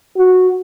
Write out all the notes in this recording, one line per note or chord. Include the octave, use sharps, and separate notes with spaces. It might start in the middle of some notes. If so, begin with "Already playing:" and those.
F#4